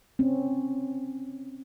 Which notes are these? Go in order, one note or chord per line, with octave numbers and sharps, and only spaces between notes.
C4 C#4